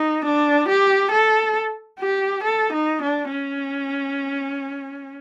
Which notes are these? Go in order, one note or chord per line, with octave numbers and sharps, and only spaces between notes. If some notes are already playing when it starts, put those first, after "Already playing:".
Already playing: D#4
D4
G4
A4
G4
A4
D#4
D4
C#4